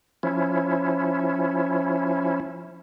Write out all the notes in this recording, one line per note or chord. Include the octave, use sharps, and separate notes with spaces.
F3 C#4 E4